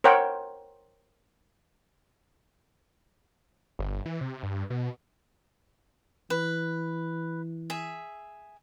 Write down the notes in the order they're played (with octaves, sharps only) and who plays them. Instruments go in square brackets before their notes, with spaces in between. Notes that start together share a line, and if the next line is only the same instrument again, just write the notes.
[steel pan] A#4 C5 C#5 F#5 G5
[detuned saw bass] G1
E3
C3
G2
B2
[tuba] E3 [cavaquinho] B4
[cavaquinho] G#4 E5